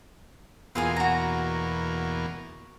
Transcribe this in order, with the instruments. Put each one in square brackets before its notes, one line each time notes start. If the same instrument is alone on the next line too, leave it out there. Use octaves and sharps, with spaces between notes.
[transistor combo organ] E2 B2 A#3 [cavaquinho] F4 G#4 G#5
[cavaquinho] F#4 A#5